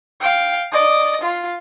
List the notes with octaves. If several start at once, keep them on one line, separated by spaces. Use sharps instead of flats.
F5 G5
D5 D#5
F4